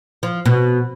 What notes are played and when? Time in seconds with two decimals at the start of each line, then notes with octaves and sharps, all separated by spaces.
0.23 F3
0.46 B2